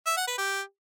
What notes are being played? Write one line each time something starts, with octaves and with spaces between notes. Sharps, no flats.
E5
F#5
B4
G4